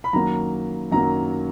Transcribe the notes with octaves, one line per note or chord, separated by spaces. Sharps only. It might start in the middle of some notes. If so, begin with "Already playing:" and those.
B5
F#2 D#3 F#3 A#3 A#5
F#2 D#3 F#3 A#3 A#5